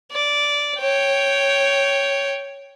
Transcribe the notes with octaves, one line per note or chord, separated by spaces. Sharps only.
D5
C#5 G5